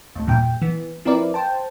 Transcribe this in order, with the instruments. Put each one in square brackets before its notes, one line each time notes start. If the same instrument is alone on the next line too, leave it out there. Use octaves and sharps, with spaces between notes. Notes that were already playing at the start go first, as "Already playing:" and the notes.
[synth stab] D#2 A2
E2 G2 A#2 G5
E3 B3
F3 C4 E4 A#4 B4 D5
C5 G5 A5